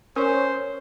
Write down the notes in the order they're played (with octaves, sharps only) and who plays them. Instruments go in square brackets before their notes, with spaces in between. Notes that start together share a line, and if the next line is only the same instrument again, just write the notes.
[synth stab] C#4 [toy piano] A#4 C#5 [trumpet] C5